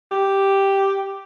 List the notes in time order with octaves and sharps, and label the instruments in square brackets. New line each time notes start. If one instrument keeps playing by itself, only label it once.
[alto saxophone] G4